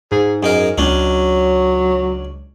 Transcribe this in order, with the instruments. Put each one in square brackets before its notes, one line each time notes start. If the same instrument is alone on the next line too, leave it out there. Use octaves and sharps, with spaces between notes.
[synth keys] G#2 [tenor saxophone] G#4
[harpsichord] F#2 D#4 A#4 [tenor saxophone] G#4
[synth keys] C#2 [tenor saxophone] F#3 [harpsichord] C#4 D4